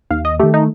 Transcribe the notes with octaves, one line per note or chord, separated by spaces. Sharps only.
D#2 F5
D#5
D#3 A3 G4
D#4